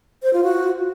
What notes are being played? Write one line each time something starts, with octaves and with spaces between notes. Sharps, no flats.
C5
F4
F#4